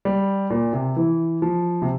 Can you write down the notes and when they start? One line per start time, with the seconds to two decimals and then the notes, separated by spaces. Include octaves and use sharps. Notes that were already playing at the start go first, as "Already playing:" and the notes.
0.05 G3
0.50 A#2
0.73 C3
0.96 E3
1.42 F3
1.82 C3